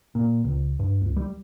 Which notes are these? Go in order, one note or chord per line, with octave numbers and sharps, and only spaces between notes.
A#2
C#2
G2
C#2
G3